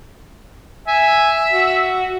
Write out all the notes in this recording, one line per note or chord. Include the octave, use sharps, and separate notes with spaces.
E5 G#5
F#4